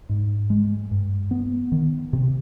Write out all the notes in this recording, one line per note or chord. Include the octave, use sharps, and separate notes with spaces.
G#2
G#3
G2
B3
D#3
C3